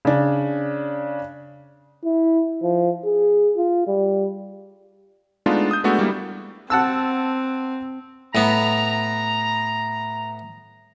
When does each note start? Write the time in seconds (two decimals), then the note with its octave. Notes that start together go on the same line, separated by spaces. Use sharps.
0.05 C#3 D4
2.05 E4
2.62 F3
3.05 G#4
3.57 F4
3.87 G3
5.46 G#3 A3 B3 D4 D#4 F4
5.71 D#6 G6
5.84 G#3 A3 B3 D4 F#4 A4
5.99 G3 A#3 E4
6.70 C4 F#5 A5 E6
8.35 A2 B3 A#5